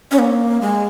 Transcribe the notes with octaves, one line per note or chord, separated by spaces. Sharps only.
C#4
A#3
G#3